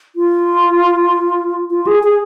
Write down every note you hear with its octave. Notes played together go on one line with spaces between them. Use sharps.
F4
F4
G#4
G#4